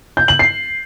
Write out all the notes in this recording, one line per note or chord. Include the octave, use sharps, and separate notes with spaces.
G6
F#7
C7